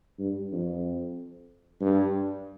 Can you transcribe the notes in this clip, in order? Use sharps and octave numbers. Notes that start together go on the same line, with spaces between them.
G2
F2
G2